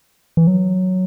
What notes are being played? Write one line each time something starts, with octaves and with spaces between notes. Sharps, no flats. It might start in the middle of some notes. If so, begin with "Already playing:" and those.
E3
F#3